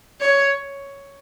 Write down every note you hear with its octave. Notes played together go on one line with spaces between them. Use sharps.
C#5